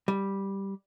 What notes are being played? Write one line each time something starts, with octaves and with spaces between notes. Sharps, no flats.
G3